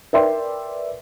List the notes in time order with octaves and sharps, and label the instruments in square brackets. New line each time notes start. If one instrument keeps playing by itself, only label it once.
[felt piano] A#4 B4 D5 E5 G5 C6